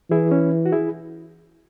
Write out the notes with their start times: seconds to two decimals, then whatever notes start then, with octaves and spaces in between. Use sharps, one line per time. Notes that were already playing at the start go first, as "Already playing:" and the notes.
0.11 E3 E4 G#4
0.31 C#4 E4
0.66 F#4
0.72 E4 G#4